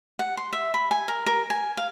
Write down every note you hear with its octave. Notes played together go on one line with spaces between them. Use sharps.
F#5
C6
E5
B5
G#5
A#4
A#4
G#5
F5